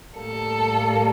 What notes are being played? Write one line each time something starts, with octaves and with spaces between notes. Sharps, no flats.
A2 G3 A#3 A4